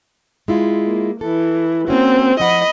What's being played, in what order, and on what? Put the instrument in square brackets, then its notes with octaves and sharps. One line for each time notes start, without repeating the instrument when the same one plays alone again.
[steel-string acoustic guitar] G#3 E4 F4
[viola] A#3
[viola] E3 [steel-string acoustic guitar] A4
[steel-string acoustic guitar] A#3 C#4 F#4 [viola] C4
[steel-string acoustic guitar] F3 E4 F#5 [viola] D#5 B5